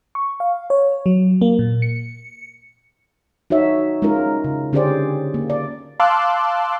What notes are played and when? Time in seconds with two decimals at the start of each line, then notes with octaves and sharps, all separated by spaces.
0.15 C#6
0.40 F5
0.70 C#5
1.06 F#3
1.41 A#3
1.59 A#2
1.82 C#7
3.50 D#4 F#4 C#5 E5
4.02 G#3 C#4 D#4 F4 A#4
4.44 C#3
4.73 D3 C#4 G4 G#4 C5 D5
5.34 A#3
5.50 D5
6.00 F5 A5 C6 D6 E6 F#6